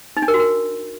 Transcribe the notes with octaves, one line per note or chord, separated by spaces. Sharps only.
D#4
D4
A#4
F#4
A#4